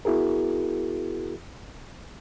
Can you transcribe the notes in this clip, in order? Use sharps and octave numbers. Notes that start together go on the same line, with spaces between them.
B3 E4 F#4 G#4 A#4